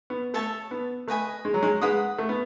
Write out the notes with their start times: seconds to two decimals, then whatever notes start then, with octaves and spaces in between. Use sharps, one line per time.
0.10 B3
0.34 A3 A4 C#5 E5 A5
0.71 B3
1.08 A3 B4 D#5 G#5 B5
1.45 G#3
1.54 F#3
1.63 G#3
1.81 G#3 B4 F#5 B5 D#6
2.19 A3
2.29 B3